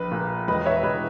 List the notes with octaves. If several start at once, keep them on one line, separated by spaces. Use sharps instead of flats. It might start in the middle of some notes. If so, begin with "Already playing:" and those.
Already playing: A#1 B4
A#2
E1 B4 D#5
C#5 E5
E2 B2 B4 D#5